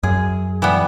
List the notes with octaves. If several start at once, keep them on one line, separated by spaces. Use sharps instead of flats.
F#2 G#4
E3 G3 B3